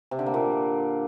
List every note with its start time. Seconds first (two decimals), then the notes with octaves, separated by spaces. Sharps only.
0.11 C3
0.19 D3
0.26 A#3
0.34 A#2